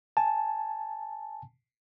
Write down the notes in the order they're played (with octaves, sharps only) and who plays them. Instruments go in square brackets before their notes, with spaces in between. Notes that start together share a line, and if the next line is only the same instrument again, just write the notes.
[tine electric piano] G#5 A5